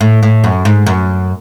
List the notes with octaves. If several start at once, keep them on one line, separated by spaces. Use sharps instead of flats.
A2
A2
F#2
G#2
F#2